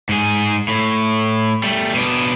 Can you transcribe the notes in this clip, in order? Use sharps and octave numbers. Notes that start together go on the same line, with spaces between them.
G#2 G#4
A2
G3 A3
B2 D4